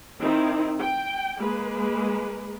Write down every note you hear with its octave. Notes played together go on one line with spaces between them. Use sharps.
D#3 C4 D#4 E4
G5
G#3 A#3 B4